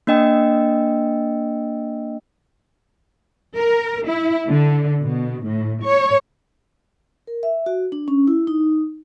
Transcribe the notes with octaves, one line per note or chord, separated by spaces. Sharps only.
A#3 D4 D#5 G5 E6
A#4
E4
D3
B2
A2
C#5
A#4
E5
F#4
D4
C#4
E4
D#4